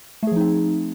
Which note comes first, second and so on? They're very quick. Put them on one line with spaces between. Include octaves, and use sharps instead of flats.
A3 G#4 F3 D#4 C4